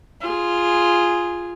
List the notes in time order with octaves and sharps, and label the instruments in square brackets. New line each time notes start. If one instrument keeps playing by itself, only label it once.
[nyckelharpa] F4 G#4